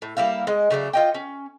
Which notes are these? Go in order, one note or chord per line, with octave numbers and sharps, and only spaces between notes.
A2
G3 A#3 E4 F5
G#3 D#5
C#3 F#3 A3 D4
F4 D#5 G5
C#4